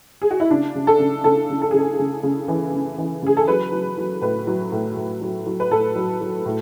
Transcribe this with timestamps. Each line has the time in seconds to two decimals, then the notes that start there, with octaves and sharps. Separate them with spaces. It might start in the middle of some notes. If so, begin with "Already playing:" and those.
0.22 G#4
0.31 F#4
0.40 E4
0.51 C#3 D4
0.75 C#3
0.87 A4
0.99 C#3
1.24 C#3 A4
1.49 C#3
1.62 A4
1.71 C#3 G#4
1.79 A4
1.99 C#3
2.23 C#3
2.48 E3
2.74 C#3
2.98 E3
3.22 C#3 G#4
3.37 A4
3.48 F#3 B4
3.72 F#3
3.98 F#3
4.22 A2 B4
4.47 F#3
4.72 A2
4.96 A2
5.21 F#3
5.46 F#3
5.60 B4
5.71 A2 A4
5.96 F#3
6.21 F#3
6.46 A2